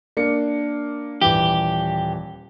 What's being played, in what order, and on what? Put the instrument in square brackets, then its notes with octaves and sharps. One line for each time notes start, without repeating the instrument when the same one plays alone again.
[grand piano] A#3 D4 C#7
[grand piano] D#1 E3 [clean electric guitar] G4